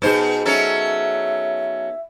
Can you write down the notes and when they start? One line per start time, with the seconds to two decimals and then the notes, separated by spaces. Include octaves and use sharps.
0.02 B2 B3 D#4 G#4 C5
0.45 F#3 C#4 A4 E5